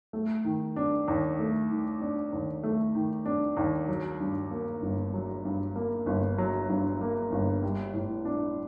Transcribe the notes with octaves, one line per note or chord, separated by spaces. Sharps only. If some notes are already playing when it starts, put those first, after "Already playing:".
A3
D#3
D4
D#2
A3
D#3
D4
D#2
A3
D#3
D4
D#2
F#3
G2
A#3
G1
F#3
G2
A#3
G1
F#3
G2
A#3
G1
G3
A2
D4